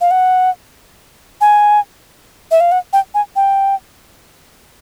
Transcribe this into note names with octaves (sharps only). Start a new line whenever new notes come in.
F5
F#5
G#5
E5
F5
F#5
G5
G#5
G5